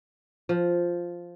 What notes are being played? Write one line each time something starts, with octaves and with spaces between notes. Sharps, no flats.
F3